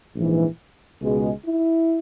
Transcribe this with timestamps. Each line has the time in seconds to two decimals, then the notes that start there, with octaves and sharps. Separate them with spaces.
0.16 A#1 G#2 E3
1.02 C#2 B2 G#3
1.46 E4